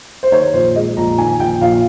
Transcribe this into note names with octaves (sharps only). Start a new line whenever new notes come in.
C5
D#3 C#5
A#1 C5
G#3 D#5
A#1 A#5
D#3 G#5
A#1 G5
A#1 F5